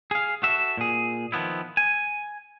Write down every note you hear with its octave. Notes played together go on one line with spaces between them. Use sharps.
G#4 F5
F#4 A4 E5
A#2 G#4
D#3 F3 B3 E4
G#5